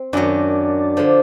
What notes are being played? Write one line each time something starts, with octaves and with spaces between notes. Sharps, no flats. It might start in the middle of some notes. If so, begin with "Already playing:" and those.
Already playing: C4
F#2 D#3 F#3 D4
D3 F3